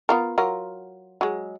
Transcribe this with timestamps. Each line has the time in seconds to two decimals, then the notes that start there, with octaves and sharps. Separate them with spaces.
0.09 B3 F4 A#4
0.38 F#3 F4 A#4
1.21 F#3 G#3